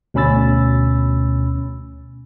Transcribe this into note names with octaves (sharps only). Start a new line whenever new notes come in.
D2 B2 C#4 B5 E6 A6